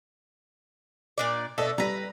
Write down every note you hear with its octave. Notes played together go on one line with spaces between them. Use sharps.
A#2 D4 D5
B2 A3 A4 D5 D#5
G3 B4 A#5 A#6